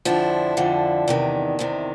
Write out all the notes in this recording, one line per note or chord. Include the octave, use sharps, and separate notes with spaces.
F2 D3 F3 D4 E4
F2 D3 F3
E2 C3 D#3
E2 C3 D#3